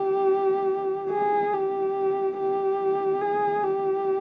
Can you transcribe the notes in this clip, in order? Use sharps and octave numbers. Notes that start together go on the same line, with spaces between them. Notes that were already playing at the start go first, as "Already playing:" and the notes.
Already playing: G4
G#4
G4
G4
G#4
G4